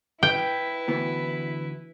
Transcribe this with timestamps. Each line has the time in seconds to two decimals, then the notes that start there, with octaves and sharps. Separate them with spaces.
0.23 E4 B4 G5
0.88 D2 E3 B3